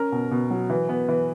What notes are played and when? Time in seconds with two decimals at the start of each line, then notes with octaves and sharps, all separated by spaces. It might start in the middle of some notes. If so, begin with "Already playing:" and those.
Already playing: C#4 A#4
0.12 B2
0.31 B2
0.51 F#3
0.70 E3
0.89 B3
1.09 E3